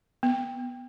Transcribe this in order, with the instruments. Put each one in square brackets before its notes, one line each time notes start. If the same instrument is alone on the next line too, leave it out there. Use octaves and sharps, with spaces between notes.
[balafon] B3